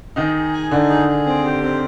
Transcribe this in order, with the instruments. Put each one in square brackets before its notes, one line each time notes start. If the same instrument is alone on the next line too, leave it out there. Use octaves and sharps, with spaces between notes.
[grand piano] D#3 D#4 [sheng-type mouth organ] G#4
[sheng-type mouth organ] G#4
G#5
[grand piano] D3 D4 [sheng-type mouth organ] D#4
[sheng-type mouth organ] G#4
G#4
C4
G4
C4